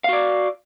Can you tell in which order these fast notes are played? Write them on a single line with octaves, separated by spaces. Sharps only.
F5 F#4 D5